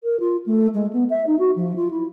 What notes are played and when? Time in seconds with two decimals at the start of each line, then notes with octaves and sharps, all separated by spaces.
0.04 A#4
0.20 F4
0.46 A3
0.74 G#3
0.93 B3
1.10 E5
1.26 D#4
1.39 F#4
1.56 F3
1.76 F4
1.90 E4